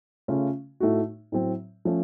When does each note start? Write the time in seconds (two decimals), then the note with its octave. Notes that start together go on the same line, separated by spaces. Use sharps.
0.28 C#3 A3 C#4 F4
0.80 A2 A3 D#4 F#4
1.32 A2 F#3 C4
1.85 F3 A3 C#4